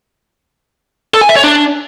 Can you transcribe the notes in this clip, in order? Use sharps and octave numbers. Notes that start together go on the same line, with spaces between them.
A4
G#5
E5
C#5
D4